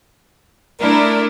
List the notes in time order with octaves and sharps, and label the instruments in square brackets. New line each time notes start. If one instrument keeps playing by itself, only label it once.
[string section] A3 D4 E4 [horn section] A#4